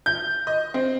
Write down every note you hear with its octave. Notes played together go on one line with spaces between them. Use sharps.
G6
D#5
C4